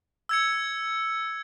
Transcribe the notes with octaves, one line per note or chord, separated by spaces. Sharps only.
E6 G#6 C#7